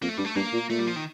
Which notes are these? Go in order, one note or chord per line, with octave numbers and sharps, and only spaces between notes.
F2 A#3
A3
G2 G3
A3
G2 A#3
A#2
A#2 A3
G3
F3
D#3